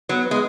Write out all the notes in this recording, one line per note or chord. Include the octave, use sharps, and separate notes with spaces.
F#3 B3
B3
G#3